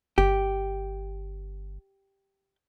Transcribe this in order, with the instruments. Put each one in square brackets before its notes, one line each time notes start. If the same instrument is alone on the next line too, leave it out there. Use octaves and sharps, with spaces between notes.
[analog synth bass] G1 [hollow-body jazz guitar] G4